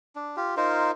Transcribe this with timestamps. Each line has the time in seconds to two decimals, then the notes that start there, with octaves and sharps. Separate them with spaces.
0.16 D4
0.37 F4 G4
0.57 D#4 F4 A#4 C5